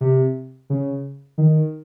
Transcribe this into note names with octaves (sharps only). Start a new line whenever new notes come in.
C3
C#3
D#3